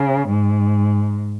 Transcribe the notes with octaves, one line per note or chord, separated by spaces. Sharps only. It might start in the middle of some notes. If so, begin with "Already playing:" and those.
Already playing: C#3
G#2